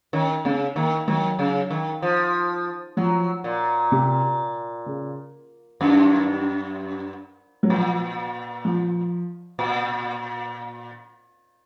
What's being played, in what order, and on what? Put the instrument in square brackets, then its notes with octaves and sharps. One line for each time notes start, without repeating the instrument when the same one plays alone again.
[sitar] D#3 [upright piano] C#4
[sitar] C#3 [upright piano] C4
[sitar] D#3 [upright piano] A#3
[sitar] D#3 [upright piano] F#3
[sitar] C#3
D#3
F3
[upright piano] F3 [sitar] F#3
[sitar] A#2
[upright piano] C3
C#3
[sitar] F#2 [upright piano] D#3
[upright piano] F#3
[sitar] A#2 [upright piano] F3
[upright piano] F3
[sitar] A#2